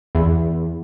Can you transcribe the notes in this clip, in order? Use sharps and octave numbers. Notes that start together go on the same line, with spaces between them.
E2